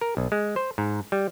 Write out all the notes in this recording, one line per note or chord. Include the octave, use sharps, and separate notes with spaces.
A#4
B1
G#3
C5
G#2
G3